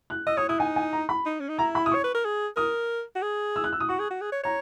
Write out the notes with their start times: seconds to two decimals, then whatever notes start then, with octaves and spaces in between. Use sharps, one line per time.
0.10 F#6
0.27 D#5 E6
0.37 C#5 D#6
0.49 E4 D#6
0.59 D#4 G#5
0.76 G#5
0.93 A#5
1.09 B5
1.25 D#4
1.40 C#4
1.49 D#4
1.59 E4 A#5
1.75 B5
1.86 D#6
1.91 C#5 C#6
2.04 B4
2.15 A#4
2.24 G#4
2.56 A#4 D#6
3.15 F#4
3.22 G#4
3.56 E6
3.64 F#6
3.72 E6
3.80 D#6
3.89 F#4 C#6
3.99 G#4
4.11 F#4
4.21 G#4
4.32 C#5
4.44 C#5 A#5